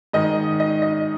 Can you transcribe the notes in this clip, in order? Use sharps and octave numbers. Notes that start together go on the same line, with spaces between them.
G#2 D#3 D#5
D#5
D#5